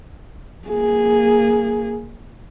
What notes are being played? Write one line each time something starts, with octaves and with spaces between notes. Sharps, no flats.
A#3 G#4